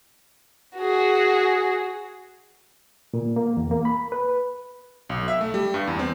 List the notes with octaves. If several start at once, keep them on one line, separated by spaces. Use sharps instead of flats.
F#4 G#4
A#2
A#3
E2
A#3
B5
B4
B1
E5
A3
G3
G2
E2
C4